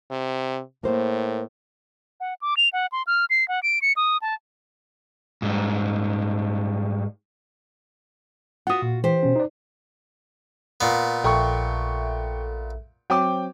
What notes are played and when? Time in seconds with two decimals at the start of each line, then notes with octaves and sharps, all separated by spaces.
0.11 C3
0.84 A2 A#3 C5
2.20 F#5
2.42 D6
2.57 F7
2.73 F#5
2.92 C6
3.07 F6
3.30 C7
3.48 F#5
3.63 D7
3.82 C#7
3.96 D#6
4.22 A5
5.42 G#2 G3
8.67 F4 F#4 F#5 D#6
8.82 A#2
9.04 E3 G4 C5
9.23 B2 C#4
9.36 D#4 D5
10.81 A#2 B3
11.24 A#1 A4 E5 G5 C#6
13.10 F#3 C4 C#5 G5 D6